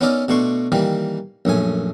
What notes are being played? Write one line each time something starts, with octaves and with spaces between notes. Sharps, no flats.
B3 C#4 D#4 A#4 D5 E5
B2 A3 D4 C6 C#6
D#3 E3 G3 A#3
A#1 F#2 A3 G#5